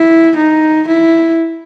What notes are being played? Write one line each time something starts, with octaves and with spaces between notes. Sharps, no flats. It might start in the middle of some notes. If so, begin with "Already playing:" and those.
Already playing: E4
D#4
E4